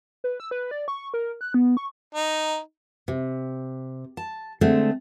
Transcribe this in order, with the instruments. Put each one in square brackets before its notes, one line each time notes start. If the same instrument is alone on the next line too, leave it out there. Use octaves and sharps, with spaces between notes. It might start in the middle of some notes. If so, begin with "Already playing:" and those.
[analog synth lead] B4
E6
B4
D5
C#6
A#4
F#6
B3
C#6
[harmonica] D#4
[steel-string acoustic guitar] C3
A5
D3 G#3 A3 C4